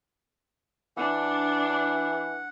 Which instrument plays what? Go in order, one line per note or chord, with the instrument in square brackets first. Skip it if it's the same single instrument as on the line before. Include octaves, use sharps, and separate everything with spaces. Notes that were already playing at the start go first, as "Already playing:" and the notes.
[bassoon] E3 [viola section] D4 [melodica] F#5